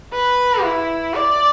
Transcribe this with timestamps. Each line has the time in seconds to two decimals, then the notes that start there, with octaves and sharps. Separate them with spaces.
0.13 B4
0.64 E4
1.15 D5